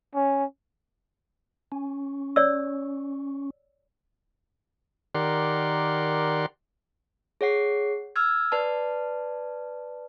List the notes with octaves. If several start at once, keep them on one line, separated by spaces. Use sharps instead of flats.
C#4
C#4
C#5 D5 E6
D#3 G4 A#4 D5 F#5 C6
G#4 C#5 F#5 C7
E6 F6 G#6
B4 D5 A5